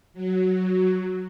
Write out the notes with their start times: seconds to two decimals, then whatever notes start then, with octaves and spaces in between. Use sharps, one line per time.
0.14 F#3